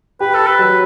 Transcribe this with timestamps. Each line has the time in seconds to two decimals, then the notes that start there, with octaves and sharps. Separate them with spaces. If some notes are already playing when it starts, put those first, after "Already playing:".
0.20 G4 B4
0.34 A4
0.40 G4
0.46 B4
0.59 F#3